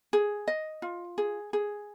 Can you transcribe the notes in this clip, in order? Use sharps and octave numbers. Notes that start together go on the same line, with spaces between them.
G#4
D#5
F4
G#4
G#4